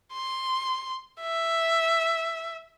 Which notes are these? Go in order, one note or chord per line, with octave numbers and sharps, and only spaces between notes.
C6
E5